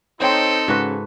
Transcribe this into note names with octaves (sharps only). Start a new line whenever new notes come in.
C4 D#4 A4 C5 C#5 G5
G#2 C#3 F#4 B4